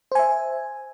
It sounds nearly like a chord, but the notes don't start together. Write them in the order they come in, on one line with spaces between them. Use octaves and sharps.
C5 G#5 E5